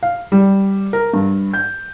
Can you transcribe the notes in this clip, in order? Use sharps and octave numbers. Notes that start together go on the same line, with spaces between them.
F5
G3
A#4
G2
G6